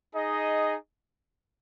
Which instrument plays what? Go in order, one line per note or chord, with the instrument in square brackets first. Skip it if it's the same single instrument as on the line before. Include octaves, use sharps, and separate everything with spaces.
[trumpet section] D#4 G#4 D#5